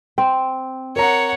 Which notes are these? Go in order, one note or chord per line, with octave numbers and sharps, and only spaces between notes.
C4
A#4 C#5 F#5 A#5